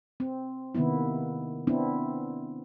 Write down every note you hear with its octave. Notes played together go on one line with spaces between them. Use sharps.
C4
C3 D#3 A#3 B3 E4
B3 C4 D4 E4